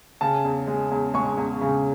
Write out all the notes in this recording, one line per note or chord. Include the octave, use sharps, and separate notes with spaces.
C#3 A5
E2
G#3
E2
G#3 C#6
E2
C#3